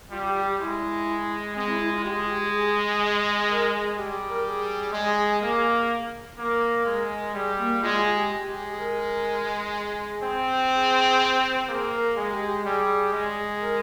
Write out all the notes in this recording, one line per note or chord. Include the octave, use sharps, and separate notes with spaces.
G3 F4
G4
G4
G#3 E4
G#3 C4
E4
E4
F4
G#3 G4
F4
G4
G#4
A#4
G#4
G3 G4
G#4
A#4
G#4
G#3
A#3
A#3 A#4
G#3
G3 G#4
A#3
G#3 F4
G#4
G4
G#3
G#4
A#4
G#4
C4
G#4
A#3 G#4
A#4
G#3 G#4
G4
G4
G3 G#4
G#3
A#4